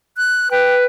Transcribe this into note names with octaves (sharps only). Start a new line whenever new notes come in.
F#6
B4 G5